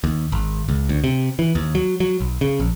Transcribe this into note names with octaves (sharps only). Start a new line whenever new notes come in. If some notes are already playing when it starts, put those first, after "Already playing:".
D#2
G#1
C#2
D2
C3
E3
D#2
F#3
F#3
B1
C#3
A#1